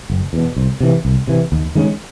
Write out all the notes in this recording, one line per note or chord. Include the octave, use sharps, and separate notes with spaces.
F#1
E2 B2
C2
C3 E3
C2
C3 E3
D#2
D#3 G#3 C#4